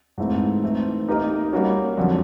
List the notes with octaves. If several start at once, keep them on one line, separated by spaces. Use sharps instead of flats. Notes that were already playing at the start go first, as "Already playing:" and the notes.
G#2 E3 A3 C4 E4
E3 A3 C4 D#4
A#3 D#4 G4 A#4 D#5
G3 A#3 C#4 F#4
F2 D3 F#3